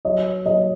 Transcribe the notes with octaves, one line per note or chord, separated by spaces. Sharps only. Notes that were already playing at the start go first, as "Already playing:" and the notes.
F#3 C#5 D#5
F#3 C#5 D#5